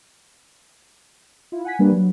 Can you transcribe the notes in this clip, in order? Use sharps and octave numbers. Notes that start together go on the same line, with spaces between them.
E4 F4
F#5 G#5 B6
G3 A#3 D4 B4
F#3